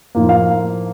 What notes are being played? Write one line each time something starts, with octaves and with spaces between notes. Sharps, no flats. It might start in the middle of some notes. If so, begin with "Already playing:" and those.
A2 F3 A#3 D#4
F5